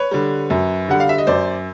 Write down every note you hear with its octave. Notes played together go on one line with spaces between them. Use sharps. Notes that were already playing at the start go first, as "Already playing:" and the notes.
Already playing: B4 C#5
D3 G3
F#2
D3 G3 F#5
F5
E5
D#5
F#2 C5 D5